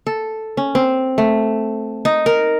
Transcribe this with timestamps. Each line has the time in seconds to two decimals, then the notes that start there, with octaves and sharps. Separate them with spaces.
0.07 A4
0.57 C#4
0.75 C4
1.18 A3
2.05 D#4
2.26 A#4